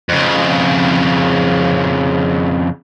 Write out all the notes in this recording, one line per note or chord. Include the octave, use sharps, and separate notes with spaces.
F2 C#3